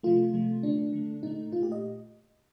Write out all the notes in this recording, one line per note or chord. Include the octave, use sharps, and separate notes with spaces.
C3 F3 A3 F4
C3 F3 A3
D3 A3 D4
D3 A3
A#2 A3 D#4
A#2 A3 F4
G4
D#5